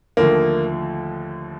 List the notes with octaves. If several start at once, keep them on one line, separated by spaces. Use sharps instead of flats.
D#2 D3 F3 A3 A#3